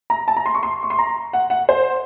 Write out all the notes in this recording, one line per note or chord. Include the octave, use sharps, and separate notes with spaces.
A#5
A5
A#5
C6
C#6
C6
C#6
C6
A#5
F#5
F#5
C5